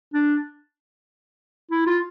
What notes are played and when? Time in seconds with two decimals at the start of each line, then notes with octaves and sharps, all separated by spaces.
0.14 D4
1.71 E4
1.87 F4